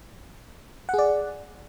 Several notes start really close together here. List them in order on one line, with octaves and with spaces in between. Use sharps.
F#5 G#4 D5